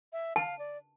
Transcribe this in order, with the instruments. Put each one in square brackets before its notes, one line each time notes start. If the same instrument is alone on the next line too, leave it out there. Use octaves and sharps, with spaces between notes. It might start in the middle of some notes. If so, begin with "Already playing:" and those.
[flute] E5
[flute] F5 [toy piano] A5
[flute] D5